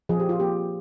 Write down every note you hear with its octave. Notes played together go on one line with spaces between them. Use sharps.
F3 G#4
G4
F4
A#3 G4